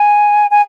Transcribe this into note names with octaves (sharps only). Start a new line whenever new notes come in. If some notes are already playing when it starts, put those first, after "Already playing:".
Already playing: G#5
G#5